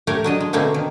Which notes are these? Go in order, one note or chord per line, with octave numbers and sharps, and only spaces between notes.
A3 G4 A#4 C#5
F#3 D4 D#5
G#3
B2 D3 A3 A#3 C4 C#4
D#3